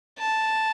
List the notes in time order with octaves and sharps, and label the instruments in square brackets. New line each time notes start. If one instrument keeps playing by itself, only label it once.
[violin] A5